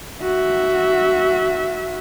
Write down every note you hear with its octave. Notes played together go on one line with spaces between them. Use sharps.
F#4 E5